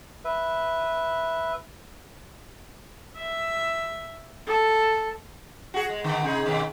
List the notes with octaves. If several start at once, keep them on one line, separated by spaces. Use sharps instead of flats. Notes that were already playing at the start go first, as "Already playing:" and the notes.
B4 E5
E5
A4
F#4 G#4
G#3
D3 D#3 B3
C3 D#4 G#4
B2 D#3 B4